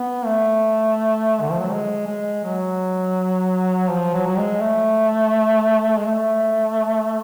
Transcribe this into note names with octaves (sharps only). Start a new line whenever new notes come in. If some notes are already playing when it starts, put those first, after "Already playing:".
Already playing: B3
A3
D3
F3
F#3
G#3
G#3
F#3
F3
F#3
F#3
G#3
A3
G#3
A3